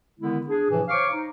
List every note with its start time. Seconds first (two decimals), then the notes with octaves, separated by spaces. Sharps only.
0.19 D3 D#3 G#3 B3 E4
0.47 D4 G#4
0.70 A2 C3 E3 F3
0.89 C5 C#5 F5 C#6 D6
1.12 D#4